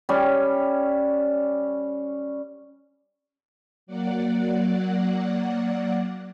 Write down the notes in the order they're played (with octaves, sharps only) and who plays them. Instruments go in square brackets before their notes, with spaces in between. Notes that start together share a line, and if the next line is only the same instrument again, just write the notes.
[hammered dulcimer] G3 C#4
[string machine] F#3 A#3 D5 F#5